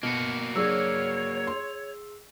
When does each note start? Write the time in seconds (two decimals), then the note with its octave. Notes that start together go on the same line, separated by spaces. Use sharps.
0.03 B2 A#3 F#4
0.56 F#3 D4 G#4 C#5 E6
1.47 C6